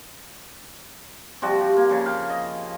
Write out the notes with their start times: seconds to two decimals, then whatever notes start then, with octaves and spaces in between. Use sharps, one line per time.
1.42 C3 F3 G3 F#4
1.61 G4
1.77 A#3
1.89 C#3 F3
2.06 F5 G5
2.30 D#5